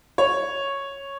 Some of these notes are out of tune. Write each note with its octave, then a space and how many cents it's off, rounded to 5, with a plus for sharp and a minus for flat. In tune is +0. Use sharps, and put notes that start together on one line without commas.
C#5 -5